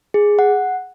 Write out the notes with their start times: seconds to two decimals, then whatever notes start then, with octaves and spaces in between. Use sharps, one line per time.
0.14 G#4
0.39 F#5